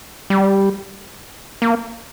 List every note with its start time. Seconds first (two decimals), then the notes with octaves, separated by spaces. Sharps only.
0.30 G3
1.62 A#3